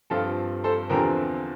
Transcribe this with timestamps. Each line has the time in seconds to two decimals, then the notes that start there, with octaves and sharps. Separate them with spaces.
0.10 G2 F3 C4 F4 A4
0.64 A4 C5
0.90 E2 D3 F3 C4 G4 A#4